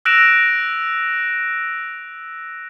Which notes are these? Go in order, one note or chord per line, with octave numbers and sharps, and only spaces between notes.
E6 F#6 A#6 D7 E7 F7